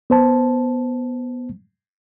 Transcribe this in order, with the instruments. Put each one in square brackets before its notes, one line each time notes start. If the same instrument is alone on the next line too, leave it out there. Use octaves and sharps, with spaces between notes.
[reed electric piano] B3 C5 A5